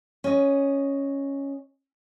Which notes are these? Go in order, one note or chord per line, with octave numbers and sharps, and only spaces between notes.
C#4 D#5